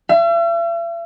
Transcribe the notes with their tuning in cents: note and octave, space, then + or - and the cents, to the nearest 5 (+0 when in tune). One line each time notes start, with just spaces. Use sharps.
E5 +45